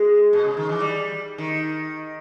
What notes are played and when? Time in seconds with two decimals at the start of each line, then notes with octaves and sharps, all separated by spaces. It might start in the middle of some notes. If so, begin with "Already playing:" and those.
Already playing: G#3
0.33 B2
0.44 C#3
0.57 D#3
0.69 E3
0.80 G3
1.38 D#3